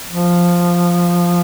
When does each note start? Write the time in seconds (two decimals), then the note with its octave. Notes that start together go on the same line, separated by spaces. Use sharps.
0.08 F3